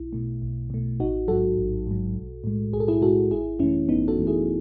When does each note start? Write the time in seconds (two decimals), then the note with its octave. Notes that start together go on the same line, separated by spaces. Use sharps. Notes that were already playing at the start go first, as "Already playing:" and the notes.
Already playing: B1 E4
0.13 B2 A3
0.42 B1
0.70 B2 A3
1.00 A1 D#4 F#4
1.28 G#2 F#3 F#4 A4
1.57 A1
1.87 G#2 F#3
2.15 B1
2.44 A2 G#3
2.73 B1 G#4
2.80 A4
2.88 E4 G#4
3.01 A2 G#3 F#4 A4
3.31 G#1 E4 G#4
3.59 F#2 E3 A3 C#4 E4
3.89 G#1 B3 D#4
4.08 F#4 A4
4.18 F#2 E3 A3
4.27 E4 G#4